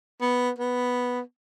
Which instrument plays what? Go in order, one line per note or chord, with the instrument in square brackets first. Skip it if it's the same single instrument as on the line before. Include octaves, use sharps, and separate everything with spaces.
[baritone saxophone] B3
B3